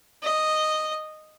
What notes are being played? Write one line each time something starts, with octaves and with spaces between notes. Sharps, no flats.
D#5